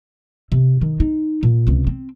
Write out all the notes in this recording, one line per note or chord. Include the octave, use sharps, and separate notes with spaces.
C3
D#3
D#4
A#2
C#2 C3
C4